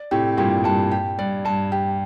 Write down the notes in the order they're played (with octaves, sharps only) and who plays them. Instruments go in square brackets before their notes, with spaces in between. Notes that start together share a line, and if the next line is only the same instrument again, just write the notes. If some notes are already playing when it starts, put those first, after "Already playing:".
Already playing: [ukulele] D5
[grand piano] A2 C3 [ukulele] G4
[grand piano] G2 A#2 [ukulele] G4
[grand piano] G2 [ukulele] A5
[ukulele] G4
[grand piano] G2 [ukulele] D5
[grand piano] G2 [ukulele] A5
[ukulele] G4